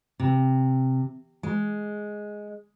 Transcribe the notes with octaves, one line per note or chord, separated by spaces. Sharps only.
C3
G#3